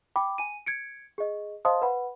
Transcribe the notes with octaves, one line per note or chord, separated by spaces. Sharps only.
G5 B5 D6
G#5 D#7
G#6 C#7 D7
G#4 D#5
C5 D#5 F5 A5 C6 D#6
B4 F#5 B5